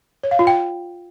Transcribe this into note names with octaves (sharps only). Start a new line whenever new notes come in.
C#5
F5
F4
G5